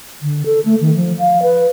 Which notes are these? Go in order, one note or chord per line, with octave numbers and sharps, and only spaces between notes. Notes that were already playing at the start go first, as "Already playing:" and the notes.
D3
A4
A3
D#3
F3
F5
B4